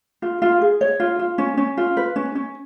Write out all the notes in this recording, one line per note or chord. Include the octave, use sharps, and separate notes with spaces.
F4
F4
G#4
C#5
F4
F4
C#4
C#4
F4
B4
C#4
C#4